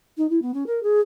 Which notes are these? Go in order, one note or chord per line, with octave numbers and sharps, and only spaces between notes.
D#4
E4
B3
C#4
A#4
G#4